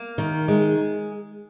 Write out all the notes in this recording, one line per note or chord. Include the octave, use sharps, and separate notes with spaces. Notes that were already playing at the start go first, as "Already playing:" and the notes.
Already playing: A#3
D#3
G#3